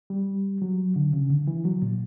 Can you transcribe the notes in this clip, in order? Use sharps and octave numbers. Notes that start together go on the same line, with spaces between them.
G3
F#3
D3
C#3
D3
E3
F#3
A#2